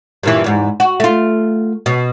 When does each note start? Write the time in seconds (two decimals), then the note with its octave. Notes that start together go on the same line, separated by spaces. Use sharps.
0.23 G2 A#2 E3
0.44 E2 G#2
0.80 F#4
1.00 A3 F4
1.86 B2